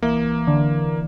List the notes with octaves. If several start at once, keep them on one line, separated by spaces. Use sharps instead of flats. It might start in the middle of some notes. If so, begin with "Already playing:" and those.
C2 E3 A#3
D3